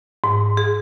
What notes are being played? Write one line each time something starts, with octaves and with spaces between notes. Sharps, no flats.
G#2
G#4